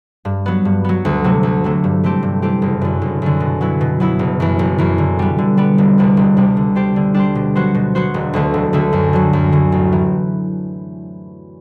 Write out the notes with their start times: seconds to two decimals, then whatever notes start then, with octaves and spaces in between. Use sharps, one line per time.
0.25 G2
0.46 F#3 B3
0.65 G2
0.84 F#3 B3
1.05 D2
1.24 C3 F#3 A3
1.43 D2
1.64 C3 F#3 A3
1.84 G2
2.03 E3 A3 C4 G4
2.23 G2
2.42 E3 A3 C4 G4
2.62 F#1
2.81 F#2 D3
3.02 F#1
3.22 F#2 D3
3.40 B2
3.61 F#3 B3 E4
3.81 B2
4.00 F#3 B3 E4
4.19 F#1
4.40 F#2 E3
4.59 F#1
4.78 F#2 E3
4.98 D3
5.19 G3 B3
5.38 D3
5.57 G3 B3
5.78 E1
5.98 D2 C3 G3 B3
6.17 E1
6.37 D2 C3 G3 B3
6.57 D3
6.75 G3 D4 G4 C5
6.96 D3
7.14 G3 D4 G4 C5
7.35 B2
7.55 F#3 B3 F#4 C5
7.74 B2
7.95 F#3 B3 F#4 C5
8.14 E1
8.33 D2 D3 A3
8.54 E1
8.73 D2 D3 A3
8.93 F#2
9.13 D3 F#3
9.33 F#2
9.52 D3 F#3
9.72 A1
9.92 E3